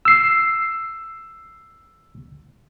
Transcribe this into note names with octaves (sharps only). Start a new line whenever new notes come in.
E6 C7